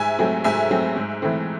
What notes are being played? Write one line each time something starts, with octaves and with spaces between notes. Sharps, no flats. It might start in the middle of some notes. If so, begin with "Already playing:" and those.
Already playing: G#2 E5 G#5
F#3 A3 C4
G#2 E5 G#5
F#3 A3 C4
G#2
E3 A3 C4